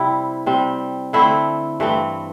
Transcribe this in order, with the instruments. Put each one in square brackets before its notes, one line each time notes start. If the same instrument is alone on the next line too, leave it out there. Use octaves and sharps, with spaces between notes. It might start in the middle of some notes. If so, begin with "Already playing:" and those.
Already playing: [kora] C3 G3 C4 E4
C3 G3 C4
D3 A3 C4 E4
G2 E3 A3 C4